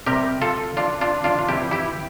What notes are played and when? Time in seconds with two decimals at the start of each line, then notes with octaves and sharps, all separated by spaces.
0.06 C3 G3 G4 A#4
0.41 F4 A4
0.77 D4 F4
1.01 D4 F4
1.24 D4 F4
1.39 F4
1.48 C3 E3 G3 E4 G4
1.71 E4 G4